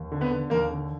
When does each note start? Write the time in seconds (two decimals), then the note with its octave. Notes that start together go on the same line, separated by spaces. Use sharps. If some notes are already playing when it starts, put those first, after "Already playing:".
Already playing: D#2
0.12 D3
0.21 B3 B4
0.31 D3
0.50 D#2 A#3 A#4
0.70 D3